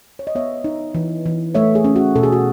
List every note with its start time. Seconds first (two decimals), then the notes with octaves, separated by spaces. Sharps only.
0.19 C#5
0.27 D#5
0.35 B3 C#5 E5
0.64 D#4
0.95 E3
1.26 E3
1.55 A3 C#5 E5
1.75 G#4
1.84 C#4
1.96 F#4
2.16 B2 A4
2.23 G#4
2.32 F#4